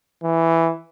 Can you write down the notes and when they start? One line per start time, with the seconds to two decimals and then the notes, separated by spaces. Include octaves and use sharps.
0.23 E3